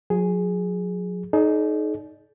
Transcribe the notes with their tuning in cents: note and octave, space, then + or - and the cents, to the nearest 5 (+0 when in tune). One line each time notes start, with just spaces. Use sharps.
F#3 -40 G#4 +0
D#4 +0 G#4 +45 D5 -30